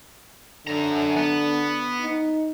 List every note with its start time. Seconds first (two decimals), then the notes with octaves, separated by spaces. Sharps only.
0.67 F#2 D3 A#5
1.17 B3
2.01 D#4